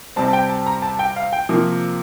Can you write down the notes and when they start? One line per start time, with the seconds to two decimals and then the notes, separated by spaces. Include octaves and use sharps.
0.16 C3 G3 C4 A5
0.28 A5
0.33 G5
0.50 A5
0.66 A#5
0.82 A5
0.99 G5
1.16 F5
1.33 G5
1.49 C3 F3 A#3